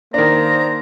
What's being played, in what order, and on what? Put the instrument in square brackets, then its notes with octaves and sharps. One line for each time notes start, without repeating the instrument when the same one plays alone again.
[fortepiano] D#3 D4 [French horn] A#3 [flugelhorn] C5 [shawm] A#5